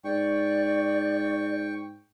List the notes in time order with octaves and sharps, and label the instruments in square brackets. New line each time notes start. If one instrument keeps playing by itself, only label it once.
[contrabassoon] G#2 [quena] D5 [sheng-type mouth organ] G5 C#6